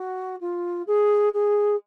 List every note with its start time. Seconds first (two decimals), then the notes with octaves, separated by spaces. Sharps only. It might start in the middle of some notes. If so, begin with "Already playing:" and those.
Already playing: F#4
0.41 F4
0.87 G#4
1.34 G#4